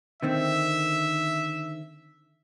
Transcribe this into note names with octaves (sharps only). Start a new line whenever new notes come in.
D3 D#3 C4 E5